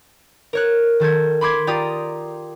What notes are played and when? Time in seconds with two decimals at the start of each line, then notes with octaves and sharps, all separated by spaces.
0.53 A#4 C#5 F#6
1.00 D#3 A4 G6 G#6
1.41 B5 C6 D6 G#6
1.67 F4 G4 D5 G5 A#5 D#6